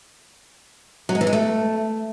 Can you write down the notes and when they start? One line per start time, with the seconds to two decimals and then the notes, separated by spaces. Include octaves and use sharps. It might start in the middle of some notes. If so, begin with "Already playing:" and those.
1.09 F#3
1.15 G#3
1.21 E3
1.27 G#3
1.33 A3